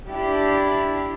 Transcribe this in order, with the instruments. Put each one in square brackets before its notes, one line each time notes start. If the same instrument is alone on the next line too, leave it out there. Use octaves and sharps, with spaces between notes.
[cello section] D4 E4 G4